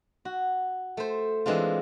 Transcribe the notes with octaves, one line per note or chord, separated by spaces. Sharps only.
F#4
A3 C5
E3 G#3 C4 D4 F4